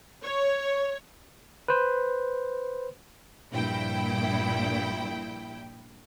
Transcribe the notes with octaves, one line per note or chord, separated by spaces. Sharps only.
C#5
B4 C5
A#1 G2 A#2 E4 G5